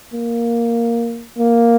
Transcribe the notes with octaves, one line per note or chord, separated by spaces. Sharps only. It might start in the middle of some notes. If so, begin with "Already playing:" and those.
A#3
A#3